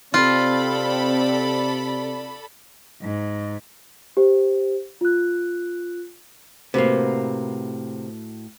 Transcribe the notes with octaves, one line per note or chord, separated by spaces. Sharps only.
C3 C4 F4 A4 D5 B5
G#2
G4 C5
F4 F#6
A2 C3 A#3 F#4 B4